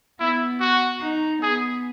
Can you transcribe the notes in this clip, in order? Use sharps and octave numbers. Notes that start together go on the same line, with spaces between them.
B3 E4
F#4
D#4
B3 G#4